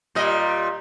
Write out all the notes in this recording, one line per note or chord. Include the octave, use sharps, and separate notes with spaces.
A#2 G3 D#5